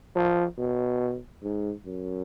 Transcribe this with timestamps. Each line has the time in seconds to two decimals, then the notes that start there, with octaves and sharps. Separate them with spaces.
0.16 F3
0.58 B2
1.43 G#2
1.86 F#2